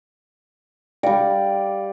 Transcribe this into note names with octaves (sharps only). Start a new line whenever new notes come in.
G3 D5 F5 G5